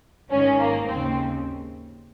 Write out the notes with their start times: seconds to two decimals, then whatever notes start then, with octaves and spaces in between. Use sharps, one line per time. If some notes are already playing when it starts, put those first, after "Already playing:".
0.30 G#1 G#2 D#3 C#4
0.59 A#3
0.87 D#2 C#3 C4